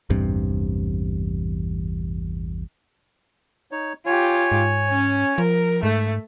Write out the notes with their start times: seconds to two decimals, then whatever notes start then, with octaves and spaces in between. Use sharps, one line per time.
0.10 A1 E2 G2 C3
3.71 D#4 C#5
4.06 F4 G4 C#5 G#5
4.52 G#2
4.88 C#4
5.38 F3 A#4
5.83 G#2 A3